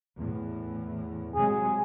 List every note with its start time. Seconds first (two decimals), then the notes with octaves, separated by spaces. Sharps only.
0.17 E2 A2
1.35 C3 F#3 G#3 G#4